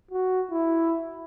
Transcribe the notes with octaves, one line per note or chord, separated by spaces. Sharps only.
F#4
E4